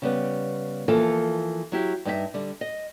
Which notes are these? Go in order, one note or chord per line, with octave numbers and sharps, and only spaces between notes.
C#3 G3 B3
E3 F3 A#3 F4 A4
F#3 E4 G4
G2 D#4 F4 E5
D3 G3
D#5